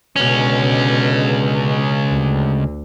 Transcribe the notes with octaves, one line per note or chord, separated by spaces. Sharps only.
C#2 B2 D3 C#4
D2